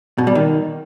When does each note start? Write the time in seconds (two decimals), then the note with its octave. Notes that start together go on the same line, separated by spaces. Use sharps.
0.18 B2
0.27 G3
0.35 D#3